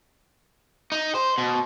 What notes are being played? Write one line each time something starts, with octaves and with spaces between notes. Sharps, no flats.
D#4
C5
B2